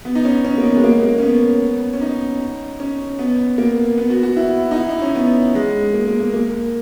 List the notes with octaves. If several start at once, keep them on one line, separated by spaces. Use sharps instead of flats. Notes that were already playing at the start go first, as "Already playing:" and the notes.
B3
D#4
C#4
C#4
A#3
B3
G#3
A#3
A#3
C#4
B3
C#4
D#4
C#4
B3
A#3
B3
F#4
F#4
E4
D#4
E4
D#4
C#4
B3
G#3
A#3
A#3
A#3
A#3